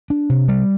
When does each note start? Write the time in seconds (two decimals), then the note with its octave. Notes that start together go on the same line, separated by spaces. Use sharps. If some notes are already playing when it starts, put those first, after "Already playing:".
0.10 D4
0.30 C3
0.48 G3